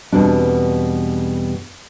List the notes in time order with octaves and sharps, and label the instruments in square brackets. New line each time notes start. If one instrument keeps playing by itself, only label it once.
[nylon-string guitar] E2 B2 G3 C4 D4